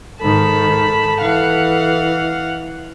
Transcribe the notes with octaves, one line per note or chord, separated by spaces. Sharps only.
G#2 D#3 A4 A5 B5
E3 F5 F#5